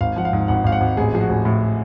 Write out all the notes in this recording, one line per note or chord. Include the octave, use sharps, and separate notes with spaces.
G#1 F5
F3 F#5
F5
G#2
G#1 F#5
G#1 F5
F#5
G#1
A1 G#4
F3 G#4
F#4
A1
A2